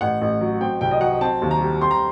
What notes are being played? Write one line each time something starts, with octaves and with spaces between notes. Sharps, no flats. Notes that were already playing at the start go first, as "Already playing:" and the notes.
A1 F#5
A1
F#3
C4 G5
C2 G5
D#5
F#3 F#5
C4 A5
D#2
A#5
G3
C4 C6
A#5